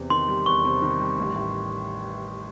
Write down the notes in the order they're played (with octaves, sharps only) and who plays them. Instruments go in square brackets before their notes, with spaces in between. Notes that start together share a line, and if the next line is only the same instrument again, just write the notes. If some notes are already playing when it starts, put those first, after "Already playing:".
Already playing: [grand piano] E2 C3
[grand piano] D#3 [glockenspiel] C6
[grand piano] G3
[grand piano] E2 [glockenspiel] C#6
[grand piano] C3
D#3
G3
A1
A2